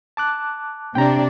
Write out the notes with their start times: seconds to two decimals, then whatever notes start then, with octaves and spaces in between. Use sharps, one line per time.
0.17 A5 D6 F#6
0.95 C3 D4 G5 A#5